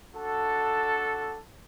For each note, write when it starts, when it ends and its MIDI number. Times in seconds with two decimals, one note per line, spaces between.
0.15 1.38 62
0.15 1.38 66
0.15 1.38 69